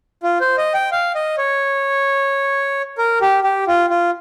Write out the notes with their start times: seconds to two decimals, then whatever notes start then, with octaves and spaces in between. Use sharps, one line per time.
0.23 F4
0.41 C5
0.58 D#5
0.74 G5
0.92 F5
1.15 D#5
1.38 C#5
2.98 A#4
3.21 G4
3.44 G4
3.67 F4
3.90 F4